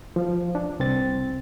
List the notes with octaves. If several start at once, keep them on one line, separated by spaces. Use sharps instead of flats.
F3
D4
C2 C4 A6